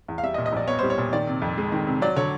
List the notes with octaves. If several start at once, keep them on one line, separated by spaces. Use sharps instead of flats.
E2
F5
G3 E5
D#5
A#2
D#5
A#1 D5
B3 C#5
G3 C5
C#5
A#2
D#3 D5
C3
F2
G#3
D#3
C3
F#3 D5
D3 C#5